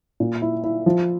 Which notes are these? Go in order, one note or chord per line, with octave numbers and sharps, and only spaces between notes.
A#2
E4
E4
F3